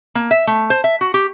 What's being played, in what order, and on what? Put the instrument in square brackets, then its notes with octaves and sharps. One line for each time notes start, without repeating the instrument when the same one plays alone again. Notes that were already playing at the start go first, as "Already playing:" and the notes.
[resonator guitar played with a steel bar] A#3
E5
A3
C5
E5
F#4
G4